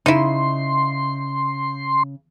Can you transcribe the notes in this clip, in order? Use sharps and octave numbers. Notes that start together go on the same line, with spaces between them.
C#3 D#4 E4 C6